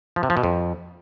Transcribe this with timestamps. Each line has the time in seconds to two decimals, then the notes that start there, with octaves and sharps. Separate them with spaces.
0.16 F3
0.23 C3
0.30 F3
0.37 B2
0.43 F2